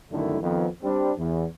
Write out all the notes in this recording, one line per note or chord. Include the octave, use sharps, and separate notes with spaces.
C2 F#2 D3 D#3 A3 E4
F2 D#3 B3
G3 C4 D4
E2